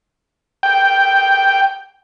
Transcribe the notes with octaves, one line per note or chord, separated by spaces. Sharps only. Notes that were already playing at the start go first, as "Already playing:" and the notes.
G5